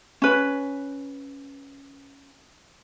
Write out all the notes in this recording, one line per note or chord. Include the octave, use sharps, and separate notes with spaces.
C#4 B4